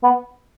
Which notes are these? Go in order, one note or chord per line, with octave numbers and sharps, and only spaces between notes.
B3